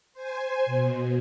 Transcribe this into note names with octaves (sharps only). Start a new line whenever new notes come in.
C5 G#5
B2